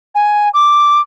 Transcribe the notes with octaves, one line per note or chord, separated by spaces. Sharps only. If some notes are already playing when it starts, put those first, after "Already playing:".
G#5
D6